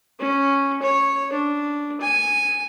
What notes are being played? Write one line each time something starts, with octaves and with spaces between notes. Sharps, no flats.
C#4
C#5
D4
G#5